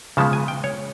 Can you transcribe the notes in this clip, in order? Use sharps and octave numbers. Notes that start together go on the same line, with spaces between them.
C#3 F3 G#3 B3 A5
G#5
G5
C#5